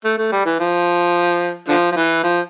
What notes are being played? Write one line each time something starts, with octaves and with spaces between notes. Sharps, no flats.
A3
A3
G3
E3
F3
D3 F3
F3
E3
F3